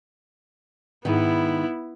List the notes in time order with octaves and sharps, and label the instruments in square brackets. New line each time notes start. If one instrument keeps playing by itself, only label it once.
[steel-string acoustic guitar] G#2 D#3 [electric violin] B3 E4